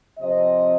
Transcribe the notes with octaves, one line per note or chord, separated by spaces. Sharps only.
C3 F3 C4 D#5